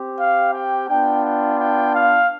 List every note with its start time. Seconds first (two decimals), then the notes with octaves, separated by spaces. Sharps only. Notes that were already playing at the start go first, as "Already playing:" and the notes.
Already playing: C4 G4
0.18 F5
0.53 G5
0.89 B3 D4 F4 G5
1.23 G5
1.59 G5
1.94 F5